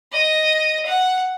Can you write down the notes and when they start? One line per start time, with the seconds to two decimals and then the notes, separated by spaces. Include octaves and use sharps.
0.12 D#5
0.85 F#5